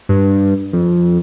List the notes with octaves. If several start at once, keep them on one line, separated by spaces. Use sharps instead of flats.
G2
F2